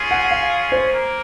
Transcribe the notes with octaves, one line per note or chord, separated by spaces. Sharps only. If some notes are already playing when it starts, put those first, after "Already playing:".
Already playing: C#4 F4 G#4
F#5
F5
C5
A#3